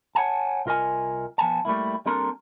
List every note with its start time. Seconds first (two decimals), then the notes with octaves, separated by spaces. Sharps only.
0.15 C#5 F#5 G#5 A5
0.66 C2 F4 A#4 D#5 G#5
1.38 F3 B3 G#5 A5
1.65 G3 A3 A#3 E4
2.06 G3 A#3 C4 D4 A4 A#4